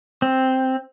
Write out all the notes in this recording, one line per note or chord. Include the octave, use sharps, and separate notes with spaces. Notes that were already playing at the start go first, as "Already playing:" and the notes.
C4